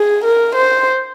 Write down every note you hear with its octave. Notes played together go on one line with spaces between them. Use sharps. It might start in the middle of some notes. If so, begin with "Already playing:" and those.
Already playing: G#4
A#4
C5